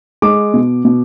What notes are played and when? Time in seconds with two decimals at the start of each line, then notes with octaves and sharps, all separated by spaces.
0.22 G#3 D6
0.54 B2
0.85 B2